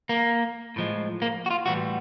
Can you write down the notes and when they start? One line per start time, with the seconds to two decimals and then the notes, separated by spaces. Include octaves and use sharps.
0.09 A#3
0.76 A2 F3 G#3
1.22 A#3
1.46 F#4
1.51 F4
1.66 A2 E3 G3 F#4